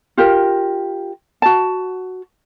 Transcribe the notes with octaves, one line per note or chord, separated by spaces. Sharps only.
F4 G4 A#4
F#4 A5